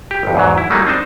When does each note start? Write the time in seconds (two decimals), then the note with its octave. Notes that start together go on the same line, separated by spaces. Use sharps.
0.11 G4
0.23 G1 F2
0.35 E2 G#2 F#3
0.58 E4
0.70 F#3 G3 A3 A#3 D#4
0.86 C4 D4 D#4 C5